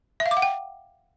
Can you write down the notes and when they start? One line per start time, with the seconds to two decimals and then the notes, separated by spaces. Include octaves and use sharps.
0.20 E5
0.26 F5
0.31 D6
0.37 F#5
0.42 G5